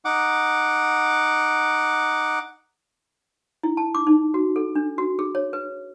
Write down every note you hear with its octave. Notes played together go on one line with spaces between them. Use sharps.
D#4 F#5 D6
E4
A5
D6
D#4
F#4
A4
D4
F#4
G#4
C#5
B4